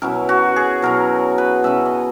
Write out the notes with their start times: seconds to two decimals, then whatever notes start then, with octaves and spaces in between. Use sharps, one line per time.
0.02 B2 F#3 C#4 E4 A#4
0.29 F#4
0.56 G#4
0.82 B2 F#3 C#4 E4 A#4
1.38 B4
1.64 B2 F#3 C#4 E4 E5
1.85 D#5